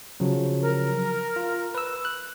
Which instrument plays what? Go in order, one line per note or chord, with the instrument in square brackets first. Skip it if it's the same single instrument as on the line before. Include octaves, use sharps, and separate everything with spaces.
[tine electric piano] C#3 F3 F#3
[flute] A#4
[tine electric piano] F4
B4 E6
F#6